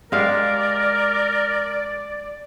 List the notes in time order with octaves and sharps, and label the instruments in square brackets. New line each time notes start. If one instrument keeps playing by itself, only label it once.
[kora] G#3 G4 F5 [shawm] A#4 [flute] D5